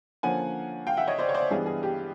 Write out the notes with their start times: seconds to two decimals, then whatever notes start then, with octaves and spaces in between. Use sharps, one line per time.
0.23 D3 F3 A#3 C#4 F#5 G#5
0.87 F5 G5
0.97 E5 F#5
1.08 C#5 D#5
1.18 C5 D5
1.29 C#5
1.34 C5 D5
1.51 G2 E3 G3 B3 G#4
1.66 G#4
1.83 G4